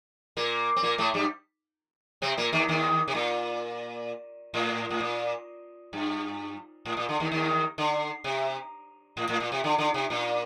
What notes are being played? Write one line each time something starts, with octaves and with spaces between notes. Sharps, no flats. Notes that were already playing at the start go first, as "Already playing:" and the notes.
A#2 A#3
C4
A#2 A#3
A2 A3
G2 G3
C3 C4
A#2 A#3
D#2 D#3
D#2 D#3
C3
A#2
A2
A2
A#2
G2
A2
A#2
D3
D#2 D#3
D#2 D#3
D3
C3
A2
A2
A#2
C3
D3
D3
C3
A#2